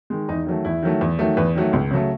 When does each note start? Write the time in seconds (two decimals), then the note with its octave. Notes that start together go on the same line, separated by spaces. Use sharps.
0.10 D#3 G#3
0.29 E2 D#4
0.46 D#3 F#3 A3
0.65 E2 E4
0.83 D#3 F#3 A3
1.01 E2
1.19 D#3 F#3 A3
1.37 E2 B4
1.55 D#3 F#3 A3
1.73 C#2
1.91 C#3 F#3 A3